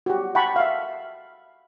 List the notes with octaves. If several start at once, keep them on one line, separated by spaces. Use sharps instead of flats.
F#4 G4
F#5 G5 A5 B5 C#6
E5 F5